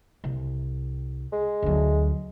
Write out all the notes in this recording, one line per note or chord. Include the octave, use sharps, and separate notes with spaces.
C2
G#3
D2 F#3